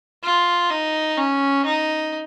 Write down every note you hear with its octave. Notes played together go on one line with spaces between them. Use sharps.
F4
D#4
C#4
D#4